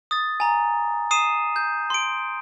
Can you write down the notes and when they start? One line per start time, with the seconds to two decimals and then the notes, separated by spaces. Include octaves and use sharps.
0.11 D#6 A6
0.40 G#5 A#5
1.11 D#6 C7 D#7 E7
1.56 G6
1.90 C6 D7